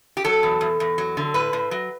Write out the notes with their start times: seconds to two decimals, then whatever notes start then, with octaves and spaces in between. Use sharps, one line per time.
0.17 G4
0.25 F#3 A4
0.43 E2
0.61 E2
0.80 E2
0.98 F#3
1.17 D3
1.34 A2 B4
1.53 A2
1.71 F#3